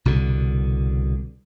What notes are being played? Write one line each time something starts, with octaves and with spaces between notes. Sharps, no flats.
C2 B2 D3